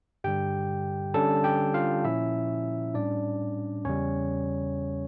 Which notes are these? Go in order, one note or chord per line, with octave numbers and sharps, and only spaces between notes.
G2 D3 G3 G4 G5
D3 G3 C#4 A4 A5
G4 G5
F4 F5
A#2 F3 C#4 E4 E5
A2 G3 C#4 D4 D5
E2 C#3 G3 C#4 C#5